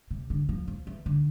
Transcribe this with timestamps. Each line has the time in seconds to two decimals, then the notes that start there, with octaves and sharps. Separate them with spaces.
0.11 C3
0.30 D3
0.49 F3
0.68 F3
0.87 E3
1.06 D3